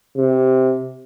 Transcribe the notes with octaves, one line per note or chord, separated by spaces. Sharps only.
C3